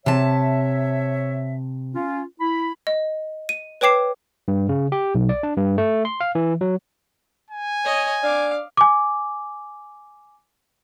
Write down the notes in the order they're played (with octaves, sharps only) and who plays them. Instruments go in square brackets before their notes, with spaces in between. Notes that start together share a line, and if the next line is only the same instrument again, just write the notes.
[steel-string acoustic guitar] C3 A5 [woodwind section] C#5 E5
[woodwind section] C#4 F4
E4 B5
[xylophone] D#5
D#7
B4 C#5 G5 D6 C7 E7
[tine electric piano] G2
C#3
G4
B1
D5
D4
G2
A3
C6
F5
E3
F#3
[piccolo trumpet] G#5
[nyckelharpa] C#5 D#5
[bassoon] D4 [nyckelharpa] F5 D6
[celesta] G#5 D6